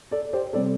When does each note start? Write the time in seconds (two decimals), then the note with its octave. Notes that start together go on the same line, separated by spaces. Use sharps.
0.11 A4 D5
0.33 G4 C5
0.53 C3 G3 C4 A4 D5